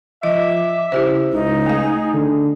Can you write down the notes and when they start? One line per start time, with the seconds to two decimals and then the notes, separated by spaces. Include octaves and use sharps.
0.23 F3 D#5 E5 D6
0.92 C#3 E4 G4 C5
1.33 C#2 D#4
1.66 A3 G#4 F5
2.13 D3